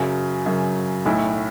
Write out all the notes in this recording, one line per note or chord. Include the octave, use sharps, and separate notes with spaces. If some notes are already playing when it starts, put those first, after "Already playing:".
Already playing: F#2 C#3 F#3
F#2 C#3 F#3
B1 A2 A3 E4